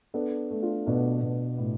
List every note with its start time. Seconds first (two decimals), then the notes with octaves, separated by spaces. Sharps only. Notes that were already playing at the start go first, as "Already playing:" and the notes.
0.14 B3 D4 A4
0.51 A3
0.62 D4 F4
0.86 B2 B3 D4
1.22 B2
1.58 A2